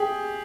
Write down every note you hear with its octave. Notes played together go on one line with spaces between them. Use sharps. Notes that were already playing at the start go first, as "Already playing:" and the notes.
Already playing: G4 G#4